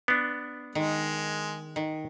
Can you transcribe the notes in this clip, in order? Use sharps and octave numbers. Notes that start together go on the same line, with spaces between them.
B3 D4
D#3 G#3
D#3